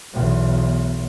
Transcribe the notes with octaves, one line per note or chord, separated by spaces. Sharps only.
B1 E2